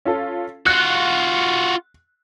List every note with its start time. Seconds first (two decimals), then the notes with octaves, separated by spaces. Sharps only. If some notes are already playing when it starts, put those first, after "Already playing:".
0.05 C#4 F4 A4
0.66 F4 F#4 F#6